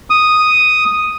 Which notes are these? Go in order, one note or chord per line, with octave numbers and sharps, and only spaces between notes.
D#6